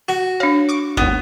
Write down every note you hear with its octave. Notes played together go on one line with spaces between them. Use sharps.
F#4
D4 C#5 F5
C#6 D6
G#1 D#2 B3